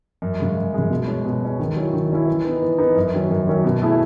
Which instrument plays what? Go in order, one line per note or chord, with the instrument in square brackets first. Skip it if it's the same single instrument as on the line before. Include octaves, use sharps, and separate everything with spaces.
[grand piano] F#2
C#3 G#3
F#2
C#3 G#3
B2
G#3 C#4
B2
G#3 C#4
D#3
F#3 C#4 E4
D#3
F#3 C#4 E4
E3
B3 D#4
E3
B3 D#4
F#2
D#3 F#3 C#4
F#2
D#3 F#3 C#4
B2
A3 E4 G#4